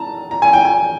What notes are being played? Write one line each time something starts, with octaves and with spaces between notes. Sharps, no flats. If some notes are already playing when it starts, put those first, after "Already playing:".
Already playing: A5 A#5
A#5
G#5
G5
G#5